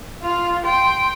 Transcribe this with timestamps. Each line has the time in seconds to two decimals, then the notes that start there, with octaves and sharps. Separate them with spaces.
0.22 F4 F5
0.65 G5 C6